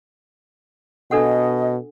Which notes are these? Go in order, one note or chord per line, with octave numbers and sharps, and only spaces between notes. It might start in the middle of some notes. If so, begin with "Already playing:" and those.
B2 D4 A4 D#5 F#5